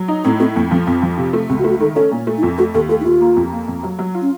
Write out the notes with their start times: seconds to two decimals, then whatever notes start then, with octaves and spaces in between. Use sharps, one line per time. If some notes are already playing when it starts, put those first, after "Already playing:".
Already playing: F#3
0.08 D#4
0.24 A2 C4
0.40 A3 C4
0.56 F2 A#3
0.71 F3 C4
0.86 F2 C4
1.02 F3
1.17 C3
1.33 A3
1.49 C#2 C4
1.59 F#4
1.64 A3
1.70 F#4
1.80 D#3 A4
1.96 C#4 A4
2.11 A#2
2.27 A3
2.38 D#4
2.42 F2 F4
2.58 A3 F#4
2.74 D#2 A4
2.89 A3 A4
3.00 D#4
3.05 D#2 F4
3.21 A#3
3.36 F2
3.52 A#3
3.68 F2
3.83 F#3
3.99 F#3
4.14 F4
4.22 C#4